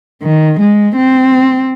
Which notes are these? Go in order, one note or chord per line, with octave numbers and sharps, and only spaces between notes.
D#3
G#3
C4